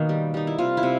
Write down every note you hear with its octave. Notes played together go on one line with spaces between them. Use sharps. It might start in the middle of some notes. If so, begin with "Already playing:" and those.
Already playing: B2 D#3 A#3
G3
G3 D#4
E4
C3 F4
E4
C3